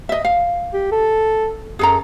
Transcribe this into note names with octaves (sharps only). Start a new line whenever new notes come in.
D#5 E5
F5
G4
A4
F#2 G#4 A4 A#5